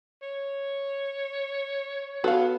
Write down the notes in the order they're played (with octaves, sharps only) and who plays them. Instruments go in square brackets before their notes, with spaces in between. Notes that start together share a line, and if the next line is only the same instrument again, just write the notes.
[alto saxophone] C#5
[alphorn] B3 [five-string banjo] F#4 [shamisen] A4 F5